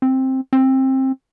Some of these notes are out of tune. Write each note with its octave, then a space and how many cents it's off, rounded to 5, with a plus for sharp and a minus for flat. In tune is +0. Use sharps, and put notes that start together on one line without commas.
C4 +10
C4 +20